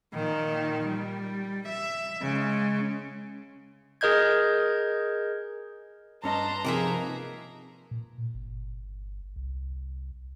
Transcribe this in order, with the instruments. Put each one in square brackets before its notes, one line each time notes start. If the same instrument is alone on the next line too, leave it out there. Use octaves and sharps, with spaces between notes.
[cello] A#2 D#3
G3
E5
C#3 G#3
[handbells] G#4 A#4 D#5 G6 G#6
[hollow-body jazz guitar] G2 C#4 D#5 [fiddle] B4 A#5 [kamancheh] A5 C6
[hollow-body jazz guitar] C3 F3 [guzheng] A#3 G#4 E5 [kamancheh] D#4
[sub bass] A#2
G1
C2